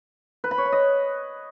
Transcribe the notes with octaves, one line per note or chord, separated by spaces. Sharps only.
B4
B5
C#5
B5
D#5